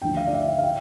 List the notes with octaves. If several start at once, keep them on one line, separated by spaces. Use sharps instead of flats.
D2 D3 F3 G5
F5
D5
E5
F5
F5
G5